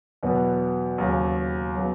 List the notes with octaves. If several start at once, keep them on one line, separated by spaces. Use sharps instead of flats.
E2 B2 F#3 B3
D#2 C#3 F#3
C#3 F#3 B3